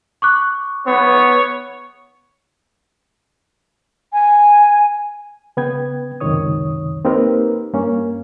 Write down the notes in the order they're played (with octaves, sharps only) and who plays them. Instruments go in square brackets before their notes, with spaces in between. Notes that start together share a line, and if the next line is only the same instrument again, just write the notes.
[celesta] C#6 D6 F#6
[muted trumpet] B3 [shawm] C#5
[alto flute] G#5
[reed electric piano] C#3 B3 B4 G5 G#6
C#2 F#2 C3 D#3 C#5 D#6
A#3 C4 D#4 G4 A#4 B4
G2 A#3 C#4